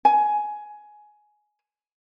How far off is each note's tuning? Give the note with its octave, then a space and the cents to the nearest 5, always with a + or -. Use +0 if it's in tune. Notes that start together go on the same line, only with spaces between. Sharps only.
G#5 +15